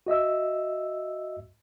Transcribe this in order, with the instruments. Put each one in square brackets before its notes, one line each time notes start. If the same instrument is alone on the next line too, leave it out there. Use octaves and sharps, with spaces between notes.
[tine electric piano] F#4 D#5 E5 E6